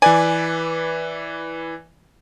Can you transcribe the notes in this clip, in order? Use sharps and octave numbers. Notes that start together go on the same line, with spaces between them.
E3 B4 D5 G#5